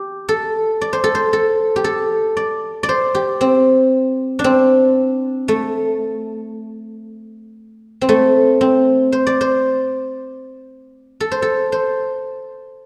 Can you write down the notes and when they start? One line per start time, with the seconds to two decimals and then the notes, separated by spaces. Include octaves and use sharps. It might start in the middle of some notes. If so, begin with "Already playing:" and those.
Already playing: G4
0.29 A4
0.81 D5
0.93 C5
1.04 A4
1.15 C5
1.33 A4
1.76 G4
1.84 A4
2.37 D5
2.83 D5
2.89 C5
3.15 G4
3.41 C4
4.39 D4
4.44 C4
5.48 A3
8.01 C4
8.09 A3
8.61 C4
9.12 C5
9.27 D5
9.41 C5
11.20 A4
11.31 C5
11.42 A4
11.72 C5